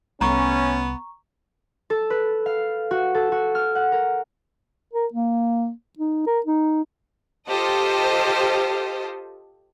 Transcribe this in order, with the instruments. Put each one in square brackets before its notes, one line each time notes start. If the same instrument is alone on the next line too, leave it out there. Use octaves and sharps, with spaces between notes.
[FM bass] C2 [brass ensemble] A3 C#4 [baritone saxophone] B3 [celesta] A#5 C#6
[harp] A4
B4
F5
F#4
A4
F#4
F6
F#5
A#4
[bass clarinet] A#4
A#3
D#4
A#4
D#4
[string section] F4 G4 A4 C5 D#5